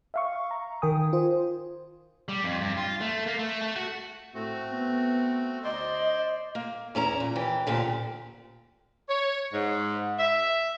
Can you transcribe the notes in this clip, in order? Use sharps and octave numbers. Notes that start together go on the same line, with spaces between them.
E5 F5 C#6
A#5
D#3 A#4 G5 G#5 D#6
F4 C5
G3
F2
G2
F4
A3
A#3
A3
A3
F#4
A2 A3 C4 F#4
B3
D2 C5 D5 D#5 C6
A#3
E2 C#4 E4 A#5
A#2
D#2 E3 G4
D2 A#2 D3 G4
C#5
G#2
E5